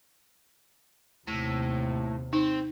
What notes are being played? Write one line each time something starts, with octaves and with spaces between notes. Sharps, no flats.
D#2 A2 C3
C4 D#4